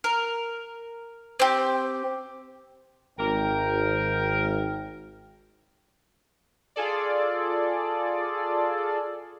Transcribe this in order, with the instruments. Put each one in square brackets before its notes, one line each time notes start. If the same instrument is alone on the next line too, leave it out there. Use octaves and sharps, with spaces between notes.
[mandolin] A#4
C4 G4
[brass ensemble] G#1 [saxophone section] A#4 [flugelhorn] G5
[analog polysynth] F4 G#4 A4 D5